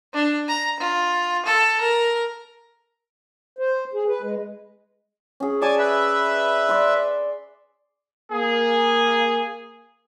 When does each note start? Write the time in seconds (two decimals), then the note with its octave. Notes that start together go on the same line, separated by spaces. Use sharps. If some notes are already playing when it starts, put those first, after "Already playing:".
0.14 D4
0.48 A#5
0.80 F4
1.46 A4
1.81 A#4
3.59 C5
3.94 G#4
4.08 B4
4.22 G#3
5.40 C#4 G#4
5.62 C#5 D5 G#5 A5 D6
5.78 B4 E5
6.69 D5 C6
8.32 A#3 G#4